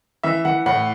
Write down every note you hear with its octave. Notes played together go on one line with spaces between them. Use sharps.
E3 E5
E3 F#5
A2 F#5